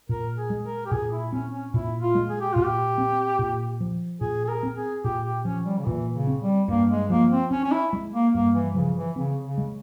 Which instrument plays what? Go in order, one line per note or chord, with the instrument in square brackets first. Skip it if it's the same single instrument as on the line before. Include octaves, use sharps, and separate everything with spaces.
[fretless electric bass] A#2 [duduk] A#4
[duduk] G#4
[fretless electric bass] G#3
[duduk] A#4
G4
[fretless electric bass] A#2 [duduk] G#4
[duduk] E4
[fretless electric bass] C4 [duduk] C#4
[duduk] C#4
[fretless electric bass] A#2 [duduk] E4
[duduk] F4
[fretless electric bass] G#3
[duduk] G#4
G4
[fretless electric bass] A#2 [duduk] F4
[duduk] G4
[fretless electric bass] C4
A#2
F3
[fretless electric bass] A#2 [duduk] G#4
[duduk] G#4
A#4
[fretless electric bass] C4
[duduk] G#4
[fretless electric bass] A#2 [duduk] G4
[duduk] G4
[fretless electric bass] F3 [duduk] C#4
[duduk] G3
C#3
[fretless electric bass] A#2 [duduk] E3
[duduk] C#3
[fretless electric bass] C4
[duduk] G3
[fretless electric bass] G2 [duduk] A#3
[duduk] G#3
[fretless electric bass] F3 [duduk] A#3
[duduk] C4
[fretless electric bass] C4 [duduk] C#4
[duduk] C#4
E4
[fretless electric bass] G#3
[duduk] A#3
[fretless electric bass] G2 [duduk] A#3
[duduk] E3
[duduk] C#3 [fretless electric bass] F3
[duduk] E3
[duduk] C#3 [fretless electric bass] C4
[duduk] C#3
[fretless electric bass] G#3